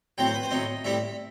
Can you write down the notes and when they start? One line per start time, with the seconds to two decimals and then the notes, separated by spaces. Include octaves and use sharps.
0.18 A2 F#3 C4 G5
0.27 C5
0.34 B4
0.43 C5
0.51 A2 F#3 C4 D#5
0.84 A2 G3 C4 E5